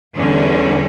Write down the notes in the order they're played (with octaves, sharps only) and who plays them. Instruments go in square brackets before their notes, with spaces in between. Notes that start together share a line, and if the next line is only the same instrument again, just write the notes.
[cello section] E2 D3 G3 C#4